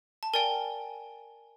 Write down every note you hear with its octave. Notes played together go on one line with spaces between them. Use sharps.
A5
A#4 D5 G5 G#5